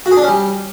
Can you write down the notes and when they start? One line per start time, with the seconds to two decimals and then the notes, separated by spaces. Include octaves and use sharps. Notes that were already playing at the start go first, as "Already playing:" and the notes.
0.06 F#4
0.11 G#4
0.17 D4
0.22 C#4
0.28 G3